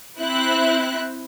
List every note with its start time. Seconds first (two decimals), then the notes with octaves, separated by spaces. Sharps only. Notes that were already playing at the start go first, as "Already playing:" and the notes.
0.20 C4 E4 F#6